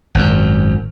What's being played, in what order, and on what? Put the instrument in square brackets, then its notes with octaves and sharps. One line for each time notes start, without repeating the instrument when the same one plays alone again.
[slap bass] G#1 F#2